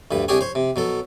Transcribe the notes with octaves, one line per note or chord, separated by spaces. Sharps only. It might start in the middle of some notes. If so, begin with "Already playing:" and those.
D2 G2 B4
C2 D4 G4 G#4 C#5 G#5
C5 C#5
C3
B2 F#3 A4